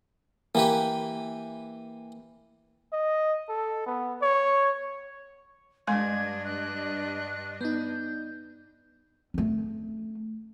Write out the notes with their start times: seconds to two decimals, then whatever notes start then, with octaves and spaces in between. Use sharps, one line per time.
0.55 E3 A#3 G4 B4
2.93 D#5
3.49 A4
3.86 B3
4.22 C#5
5.87 G2 G#3 D4 D#5 G#5 C6 G#6
6.45 F#6
7.61 B3 D#4 G6
9.34 A3 C#4